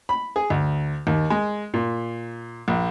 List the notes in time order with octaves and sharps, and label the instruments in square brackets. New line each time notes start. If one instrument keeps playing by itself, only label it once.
[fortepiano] B5
G#4
D2
D#2
G#3
A#2
A#1